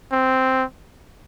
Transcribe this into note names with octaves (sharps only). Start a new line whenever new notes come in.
C4